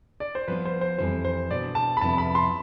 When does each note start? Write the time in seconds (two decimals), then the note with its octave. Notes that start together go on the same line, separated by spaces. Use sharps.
0.20 D5
0.35 C5
0.48 F3 B3 F4 B4
0.65 C5
0.81 C5
0.99 F2 E3 G3 C5
1.25 C5
1.50 B2 B3 D4 D5
1.75 A5
1.97 B5
2.01 F2 C3 F3 B3 E4 A5
2.18 B5
2.35 C6